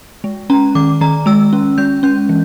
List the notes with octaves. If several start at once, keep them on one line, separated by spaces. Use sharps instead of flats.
G#3
C#4 A#5
D#3 D6
D#3 A#5
G#3 E6
C#4
G#3 G6
C#4 G6
E3